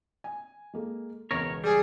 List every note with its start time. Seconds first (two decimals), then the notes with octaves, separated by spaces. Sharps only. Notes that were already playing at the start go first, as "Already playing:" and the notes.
0.24 G#5
0.73 G#3 A#3 A4
1.31 E1 C#2 B3 A#4 C#5
1.64 G3 G#4